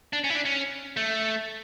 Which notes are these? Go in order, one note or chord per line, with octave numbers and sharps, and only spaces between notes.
D4
C#4
E4
D4
C#4
A3